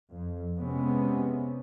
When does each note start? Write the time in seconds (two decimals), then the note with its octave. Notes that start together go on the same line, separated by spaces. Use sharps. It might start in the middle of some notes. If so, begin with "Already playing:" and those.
0.11 F2
0.58 C3 G#3 B3 C#4